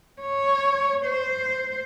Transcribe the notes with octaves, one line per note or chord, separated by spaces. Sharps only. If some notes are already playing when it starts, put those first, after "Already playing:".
C#5
C5